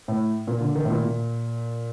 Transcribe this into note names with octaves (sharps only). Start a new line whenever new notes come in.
A2
A#2
D3
D#3
A2
A#2
A#2